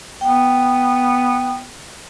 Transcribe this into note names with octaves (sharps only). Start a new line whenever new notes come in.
B3 G5